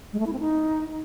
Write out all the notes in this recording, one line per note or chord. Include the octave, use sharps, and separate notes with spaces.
G#3
A3
E4
C4
D#4